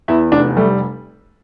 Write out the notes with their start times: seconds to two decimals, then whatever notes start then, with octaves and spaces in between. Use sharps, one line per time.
0.08 E2 E4
0.32 F1 D4
0.57 G3 A3